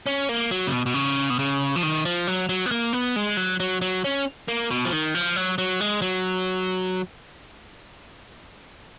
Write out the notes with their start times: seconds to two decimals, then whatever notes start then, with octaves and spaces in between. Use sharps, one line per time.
0.06 C#4
0.29 A#3
0.51 F#3
0.67 C#3
0.72 B2
0.86 B2
0.94 C#3
1.30 B2
1.39 C#3
1.76 F3
1.83 D#3
2.05 F3
2.27 F#3
2.49 F#3
2.66 B3
2.71 A#3
2.93 B3
3.16 G#3
3.37 F#3
3.60 F#3
3.81 F#3
4.04 C#4
4.48 A#3
4.70 B2
4.85 F3
4.93 D#3
5.15 F3
5.36 F#3
5.58 F#3
5.80 G#3
6.02 F#3